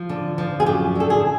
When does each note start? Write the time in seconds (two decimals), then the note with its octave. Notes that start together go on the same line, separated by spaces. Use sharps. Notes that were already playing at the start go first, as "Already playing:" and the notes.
Already playing: F3
0.09 D3
0.38 F3
0.60 G#4
0.66 F#2 G4
0.95 D3 A4
1.10 G#4